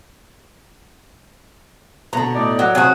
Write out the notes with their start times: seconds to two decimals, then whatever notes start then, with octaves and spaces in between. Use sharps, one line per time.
2.13 B2 D3 A#5
2.35 A2 D#4 D5
2.59 F#3
2.75 C3 F#3 F#4 G#4